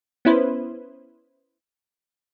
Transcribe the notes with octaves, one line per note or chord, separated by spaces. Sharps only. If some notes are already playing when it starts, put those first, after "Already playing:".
B3 C#4 E4 B4 C5